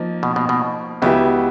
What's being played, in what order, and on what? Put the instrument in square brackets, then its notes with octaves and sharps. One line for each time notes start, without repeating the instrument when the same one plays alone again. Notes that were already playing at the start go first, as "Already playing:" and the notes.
Already playing: [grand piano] F3 A#3 D#4
[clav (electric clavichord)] B2
B2
B2
[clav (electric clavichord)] C#2 C#3 [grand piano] F#3 B3 E4 G4